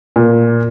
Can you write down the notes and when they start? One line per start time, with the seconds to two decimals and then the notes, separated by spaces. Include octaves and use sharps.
0.16 A#2